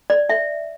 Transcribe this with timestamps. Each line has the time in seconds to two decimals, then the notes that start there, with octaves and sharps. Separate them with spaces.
0.10 D5
0.29 E5